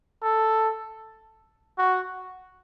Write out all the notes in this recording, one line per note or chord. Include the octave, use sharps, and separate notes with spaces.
A4
F#4